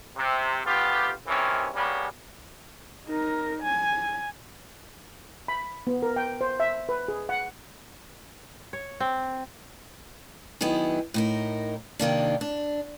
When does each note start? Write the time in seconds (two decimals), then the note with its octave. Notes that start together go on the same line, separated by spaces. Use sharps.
0.17 C3
0.65 D2 B3 F4 G4
1.27 F#2 C3 D#3 E3 C#4
1.74 C#3 G3 A#3 B3 C#4
3.07 D#4 A#4
3.63 G#5
5.48 B5
5.87 B3
6.03 A#4
6.16 G5
6.41 C5
6.60 E5
6.89 B4
7.08 G#4
7.29 F#5
8.73 C#5
9.00 C4
10.61 D#3 F#3 B3 E4 G#4
11.14 A2 D#4 A#4
11.99 C3 D#3 A#3 D4
12.41 D4